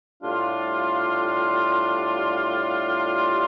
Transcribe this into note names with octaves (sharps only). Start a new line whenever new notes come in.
A2 G3 D4 F4